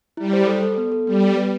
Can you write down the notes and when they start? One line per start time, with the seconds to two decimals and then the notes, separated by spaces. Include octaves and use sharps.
0.17 G3 E4
0.33 C5
0.47 A4
0.63 A4
0.78 B3
0.92 A4
1.07 G3 B3
1.23 B3
1.37 B4